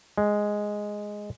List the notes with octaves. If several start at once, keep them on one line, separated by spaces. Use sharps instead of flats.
G#3